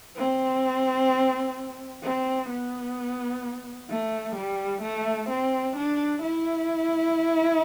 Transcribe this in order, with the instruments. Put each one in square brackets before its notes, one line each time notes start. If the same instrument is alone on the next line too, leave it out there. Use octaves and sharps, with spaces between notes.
[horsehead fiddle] C4
C4
B3
A3
G3
A3
C4
D4
E4